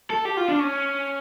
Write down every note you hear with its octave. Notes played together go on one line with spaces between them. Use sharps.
A4
G4
F4
D4
C#4